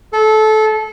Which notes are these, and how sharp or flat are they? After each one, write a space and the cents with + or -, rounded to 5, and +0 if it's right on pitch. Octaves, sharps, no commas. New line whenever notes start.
A4 -20